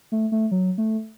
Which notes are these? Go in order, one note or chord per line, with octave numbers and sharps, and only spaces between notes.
A3
A3
F#3
A3